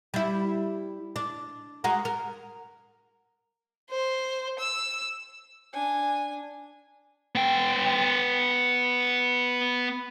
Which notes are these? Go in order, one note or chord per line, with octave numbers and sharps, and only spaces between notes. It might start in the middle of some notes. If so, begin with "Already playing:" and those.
G3 E4
D4
G#3 F#4 A#4
A#4
C5
E6
D4 G#5
B3 G5